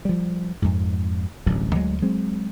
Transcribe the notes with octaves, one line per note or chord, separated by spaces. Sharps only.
F3 G3
F2 G#2
D1 A1 G2 F#3
D2 F#3 G#3
F#3 G#3 C4